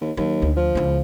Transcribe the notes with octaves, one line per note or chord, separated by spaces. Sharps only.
D#2
D#2 F#3
D2
F3
C#2 E4